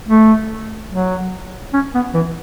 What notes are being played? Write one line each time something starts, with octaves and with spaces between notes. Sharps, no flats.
A3
F#3
C#4
B3
E3